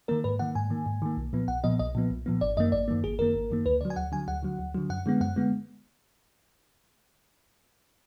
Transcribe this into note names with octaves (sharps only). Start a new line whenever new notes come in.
D#3 A#3 A#4
G#2 B4
D#3 A#3 F#5
G#2 G#5
D#3 A#3
G#2
D#3 A#3
B1
A#2 F3 B3
B1 F#5
A#2 F3 B3 D#5
B1 D#5
A#2 F3 B3
B1
A#2 F3 B3
G#1 D5
F#2 D#3 A#3 D#5
G#1 D5
F#2 D#3 A#3
G#1 G#4
F#2 D#3 A#3 A#4
G#1
F#2 D#3 A#3
D2 B4
D3 F#3 D5
G#5
D2 F#5
D3 F#3 G#5
D2 F#5
D3 F#3
D2
D3 F#3
F#2 F#5
D3 G#3 B3
F#2 F#5
D3 G#3 B3